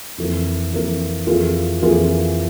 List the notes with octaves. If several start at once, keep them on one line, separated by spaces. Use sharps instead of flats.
F2 E3 A#3
F2 E3 A#3
F2 E3 A#3 F4 G#4
F2 E3 A#3 F4 G#4